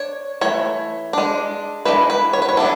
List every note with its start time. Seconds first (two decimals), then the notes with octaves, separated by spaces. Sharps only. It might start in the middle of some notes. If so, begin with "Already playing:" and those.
Already playing: D4 C#5
0.41 E3 A3 C#5
1.13 G#3 D4
1.85 E3 G#3 D4 B4
2.10 B4
2.33 C#5
2.42 B4
2.49 C#5
2.57 E3 B3 D4 A4